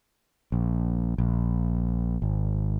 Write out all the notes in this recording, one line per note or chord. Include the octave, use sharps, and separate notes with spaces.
A#1
A#1
G#1